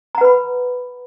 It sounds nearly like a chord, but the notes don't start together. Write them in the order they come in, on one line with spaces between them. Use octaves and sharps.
A#5 F#5 B4 B5